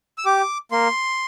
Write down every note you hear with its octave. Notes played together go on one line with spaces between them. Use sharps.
E6
G4 D6
A#3 C6